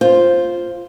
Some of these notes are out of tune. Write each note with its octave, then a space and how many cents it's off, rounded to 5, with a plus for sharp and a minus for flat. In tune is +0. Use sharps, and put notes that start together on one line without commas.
F4 +0 C5 +5